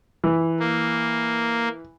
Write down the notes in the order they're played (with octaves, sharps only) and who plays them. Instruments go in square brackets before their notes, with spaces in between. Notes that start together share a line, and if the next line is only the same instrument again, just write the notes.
[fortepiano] E3
[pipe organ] A#3